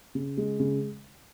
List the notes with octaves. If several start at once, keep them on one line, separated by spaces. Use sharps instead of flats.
C#3
G#3
C#3